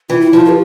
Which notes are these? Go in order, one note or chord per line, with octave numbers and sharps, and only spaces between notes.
E3 F4
E4
F3 F4
B4
G4